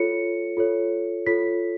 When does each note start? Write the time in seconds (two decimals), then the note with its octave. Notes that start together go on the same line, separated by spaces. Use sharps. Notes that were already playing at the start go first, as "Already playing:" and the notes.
Already playing: F4 A4 C#5 C#7
0.57 F4 A4 C#5
1.26 F4 A4 C#5 B6